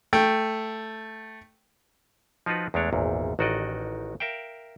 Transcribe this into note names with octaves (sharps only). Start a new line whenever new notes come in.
A3 G5
F3 D#4 F4 F#4 B4
E2 G#3 A3 D4 C#5
G#1 E2 A#2
A1 D#3 F#4 A4 D5 D#5
A#4 E5 F5 G5